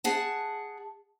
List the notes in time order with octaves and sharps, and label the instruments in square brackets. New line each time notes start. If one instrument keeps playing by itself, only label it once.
[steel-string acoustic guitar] G#4 F#5 A5